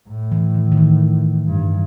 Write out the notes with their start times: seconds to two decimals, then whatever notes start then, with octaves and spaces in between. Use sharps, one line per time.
0.09 A2
0.32 E3
0.55 D#3
0.72 D#3
0.77 E3
1.46 G2